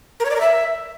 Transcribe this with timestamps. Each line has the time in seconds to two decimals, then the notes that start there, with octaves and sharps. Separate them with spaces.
0.20 A#4
0.25 C#5
0.30 D5
0.36 A#4
0.41 E5